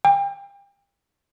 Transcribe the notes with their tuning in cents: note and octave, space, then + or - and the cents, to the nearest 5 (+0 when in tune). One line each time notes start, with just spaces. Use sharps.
G5 +35